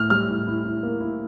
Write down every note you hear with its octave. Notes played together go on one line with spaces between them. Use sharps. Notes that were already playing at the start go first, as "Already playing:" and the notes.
Already playing: A2 E4 F6
G3 F6
A2
E4
E4
A#3
E4